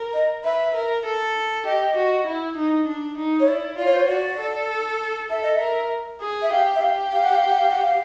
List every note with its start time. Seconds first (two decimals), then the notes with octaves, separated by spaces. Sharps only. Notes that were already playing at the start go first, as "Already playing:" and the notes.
Already playing: A#4
0.14 D#5
0.44 B4 E5
0.75 A#4
1.05 A4
1.65 G4 D#5
1.96 F#4
2.26 E4
2.57 D#4
2.87 D4
3.18 D#4
3.40 C#5
3.47 E4 D5
3.78 F4 D5
3.85 C#5
3.93 C5
4.00 C#5
4.08 F#4 D5
4.39 A4
5.30 A4 E5
5.43 D#5
5.55 E5
5.61 A#4
6.21 G#4
6.42 E5
6.51 G4 F5
6.75 E5
6.82 G4 F5
7.12 F5
7.23 F#5
7.35 F5
7.46 F#5
7.58 F5
7.70 F#5
7.81 F5